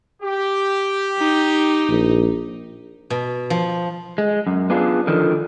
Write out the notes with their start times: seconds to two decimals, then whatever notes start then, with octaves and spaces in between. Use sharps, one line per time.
0.23 G4
1.18 D#4
1.88 A#1
3.10 B2
3.50 F3
4.18 G#3
4.47 F#2
4.70 B3 D4 F4 G#4
5.07 D3 D#3 F3